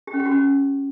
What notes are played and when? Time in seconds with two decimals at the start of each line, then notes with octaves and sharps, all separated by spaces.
0.07 G4
0.14 C#4
0.20 G4
0.26 F#4
0.32 C#4